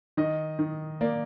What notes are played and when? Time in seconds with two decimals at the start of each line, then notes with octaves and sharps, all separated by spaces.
0.17 D#3 D#5
0.59 D#3
1.01 A#3 D5